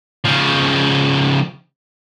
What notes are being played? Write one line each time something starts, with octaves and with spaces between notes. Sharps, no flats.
C#3 F3